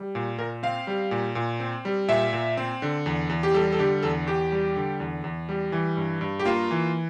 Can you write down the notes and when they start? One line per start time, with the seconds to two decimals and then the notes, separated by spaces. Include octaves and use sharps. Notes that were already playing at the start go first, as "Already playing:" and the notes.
Already playing: G3
0.15 A#2
0.38 A#2 A#4
0.63 C4 F5
0.87 G3
1.11 A#2
1.35 A#2
1.60 C4
1.85 G3
2.08 A#2 E5
2.33 A#2
2.57 C4
2.82 D3
3.06 E2
3.29 E2
3.43 G4
3.54 G3 A4
3.72 A4
3.79 D3 G4
4.03 E2 A4
4.27 E2 G4
4.52 G3
4.76 D3
5.00 E2
5.24 E2
5.49 G3
5.72 E3
5.97 G2
6.21 G2
6.40 G4
6.45 A#3 F4
6.71 E3